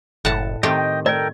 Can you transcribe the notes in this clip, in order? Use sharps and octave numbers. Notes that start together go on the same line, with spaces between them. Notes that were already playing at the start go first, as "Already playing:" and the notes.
F#1 A2 F#5 A5
D#3 A3 C4 G4 D#5 G5
A4 A#4 D5 G5